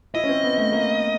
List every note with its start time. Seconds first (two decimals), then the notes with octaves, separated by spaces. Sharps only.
0.15 E4 D#5
0.24 C#4
0.29 C4
0.44 B3
0.58 A3
0.72 A#3